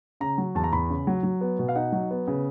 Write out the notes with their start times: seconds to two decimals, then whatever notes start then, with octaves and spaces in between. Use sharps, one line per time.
0.20 C#3 A#5
0.38 F#3
0.55 E2 A5
0.64 A#5
0.72 E2 B5
0.90 C#3
1.07 F#3
1.23 F#3
1.41 B3
1.59 B2
1.68 F5
1.75 D#4 F#5
1.92 F#3
2.11 B3
2.27 C#3